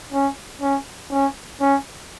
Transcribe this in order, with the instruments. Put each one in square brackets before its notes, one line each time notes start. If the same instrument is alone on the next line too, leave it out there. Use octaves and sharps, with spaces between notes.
[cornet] C#4
C#4
C#4
C#4